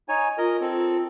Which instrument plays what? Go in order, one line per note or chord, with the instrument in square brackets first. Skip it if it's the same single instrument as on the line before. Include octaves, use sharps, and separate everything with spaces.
[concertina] D#4 C#5 G#5
[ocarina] F4 [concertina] A#4 D#5
[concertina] C4 A4